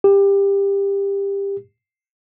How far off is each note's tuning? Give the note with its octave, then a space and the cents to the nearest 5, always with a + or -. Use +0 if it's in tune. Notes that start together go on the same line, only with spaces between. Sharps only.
G4 +20